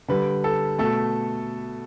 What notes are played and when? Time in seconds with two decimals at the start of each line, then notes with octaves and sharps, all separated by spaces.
0.08 D3 G3 B4
0.44 A4
0.78 B2 A3 A4